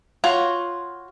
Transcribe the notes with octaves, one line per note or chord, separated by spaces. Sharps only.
F4 F#4 C#5